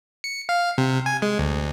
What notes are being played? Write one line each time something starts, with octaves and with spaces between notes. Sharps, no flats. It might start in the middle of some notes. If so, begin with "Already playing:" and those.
C#7
F5
C3
G#5
G#3
D2